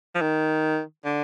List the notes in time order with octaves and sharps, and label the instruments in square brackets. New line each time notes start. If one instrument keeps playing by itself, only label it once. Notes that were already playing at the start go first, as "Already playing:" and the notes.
[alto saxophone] F3
D#3
D3